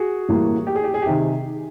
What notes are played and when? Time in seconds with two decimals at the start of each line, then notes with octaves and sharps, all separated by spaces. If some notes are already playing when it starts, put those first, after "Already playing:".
Already playing: F#4 G#4
0.29 A2 E3 G3 A#3
0.67 G4
0.76 G#4
0.84 G4
0.94 G#4
1.02 G4
1.06 C3 D#3